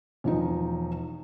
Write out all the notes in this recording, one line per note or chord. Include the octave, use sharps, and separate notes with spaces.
E1 F3 D#4